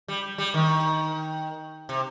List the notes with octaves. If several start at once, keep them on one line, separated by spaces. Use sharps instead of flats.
G3
G3
D#3
C3